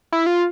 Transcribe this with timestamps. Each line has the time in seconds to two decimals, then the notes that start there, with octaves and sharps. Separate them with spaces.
0.12 E4
0.26 F4